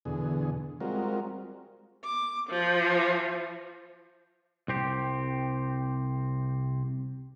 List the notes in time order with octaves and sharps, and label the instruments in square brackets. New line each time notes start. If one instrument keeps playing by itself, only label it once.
[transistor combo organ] E2 B2 D3 G#4
G3 G#3 C4 F4 F#4 A#4
[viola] D6
F3
[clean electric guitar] C2 C4 G4